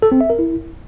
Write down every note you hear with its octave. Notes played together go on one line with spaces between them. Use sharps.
A4
C4
E5
A#4
E4